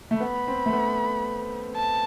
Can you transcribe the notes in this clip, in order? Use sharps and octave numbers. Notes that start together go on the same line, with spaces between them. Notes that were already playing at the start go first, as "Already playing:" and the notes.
A3
B3 B5
C4
A3
B3
A5